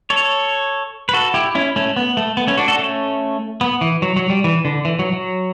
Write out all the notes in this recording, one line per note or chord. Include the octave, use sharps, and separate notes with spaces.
A4 C#5
B4
F#4 A4
E4 G4
C#4 E4
A3 C#4
B3
A3
B3
A3 C#4
D4 F#4
F#4 A4
A3 C#4
B3
E3
F#3
F#3
G3
E3
D3
E3
F#3
F#3